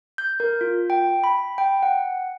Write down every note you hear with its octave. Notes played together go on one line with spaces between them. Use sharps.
G6
A#4
F4
G5
B5
G5
F#5